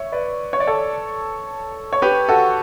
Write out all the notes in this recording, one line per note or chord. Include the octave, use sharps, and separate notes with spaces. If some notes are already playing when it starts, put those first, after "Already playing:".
Already playing: C#5 E5
B4 D5
C#5
D5
A4 C#5
C#5
G4 B4
F#4 A4